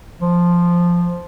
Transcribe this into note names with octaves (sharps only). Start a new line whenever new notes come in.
F3